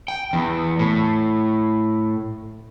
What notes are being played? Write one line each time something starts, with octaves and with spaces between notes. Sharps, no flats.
G5
E2
A2